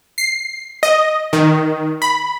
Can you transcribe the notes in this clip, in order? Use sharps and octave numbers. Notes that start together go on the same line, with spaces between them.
C7
D#5
D#3
B5